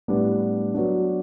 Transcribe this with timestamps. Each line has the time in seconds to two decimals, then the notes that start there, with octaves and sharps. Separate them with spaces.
0.08 A2 G3 B3 D4
0.74 F#3 B3 D4